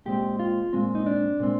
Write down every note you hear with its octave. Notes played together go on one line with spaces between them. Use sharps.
A#2 G#3 C4 G4
F4
A#2 G#3 C4
D#4
D4
A#2 G#3 C4